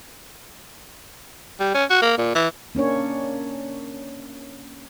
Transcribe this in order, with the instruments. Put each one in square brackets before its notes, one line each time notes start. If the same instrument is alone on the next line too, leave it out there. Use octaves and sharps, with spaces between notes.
[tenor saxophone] G3
C#4
F#4
A#3
A#2
E3
[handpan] A#3 C#4 D4 C#5